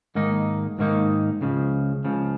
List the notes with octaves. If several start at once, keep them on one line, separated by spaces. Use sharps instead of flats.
G#2 D#3 A#3 D#4
G#2 D#3 A#3 D#4
C#2 C#3 F3
C#2 C#3 F3